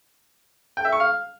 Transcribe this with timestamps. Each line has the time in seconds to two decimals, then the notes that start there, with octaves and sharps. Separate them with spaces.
0.77 G5
0.85 E5
0.92 C#6
1.00 F5